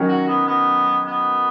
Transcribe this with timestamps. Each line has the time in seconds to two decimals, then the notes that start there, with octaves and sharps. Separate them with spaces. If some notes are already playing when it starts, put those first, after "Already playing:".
Already playing: D#3 F#3 C#4
0.09 F#4
0.28 B3
0.47 B3
1.06 B3